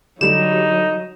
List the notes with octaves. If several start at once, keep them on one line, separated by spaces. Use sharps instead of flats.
D3 F#3 G3 D#4 E7 F7